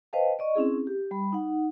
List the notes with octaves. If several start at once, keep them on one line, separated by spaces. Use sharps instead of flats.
B4 C5 D#5 F5 G5 A5
D5 D#5 C#6
C4 C#4 E4 G#4
G4
G3 B5
D#4 F#5